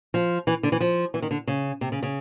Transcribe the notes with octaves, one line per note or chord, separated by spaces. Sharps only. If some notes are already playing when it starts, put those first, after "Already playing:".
F3
E3
D3
E3
F3
E3
D#3
D3
C#3
C3
C#3
C#3